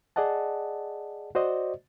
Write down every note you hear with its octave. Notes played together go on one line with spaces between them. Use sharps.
G#4 D5 D#5 F#5 A5
F#4 C5 D5 D#5